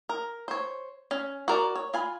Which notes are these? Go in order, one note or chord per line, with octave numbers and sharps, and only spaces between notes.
A#4
C5 C#5
C#4
F#4 A#4 D5
C#5
F4 G#5 B5